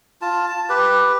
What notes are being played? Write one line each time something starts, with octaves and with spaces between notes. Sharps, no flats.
F4 A5
A5
G4 B4